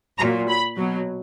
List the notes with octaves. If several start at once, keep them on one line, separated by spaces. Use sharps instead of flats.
A#2 F#3 A#5
B5
B2 F#3